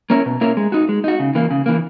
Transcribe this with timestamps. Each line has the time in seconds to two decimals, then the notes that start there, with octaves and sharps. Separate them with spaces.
0.10 A#3 C#4 E4 A#4
0.26 B2
0.41 A#3 C#4 E4 A#4
0.57 G#3
0.72 D#4 F#4
0.89 G#3
1.04 D#4 F#4
1.20 C#3
1.35 E3 A#3
1.51 C#3
1.66 E3 A#3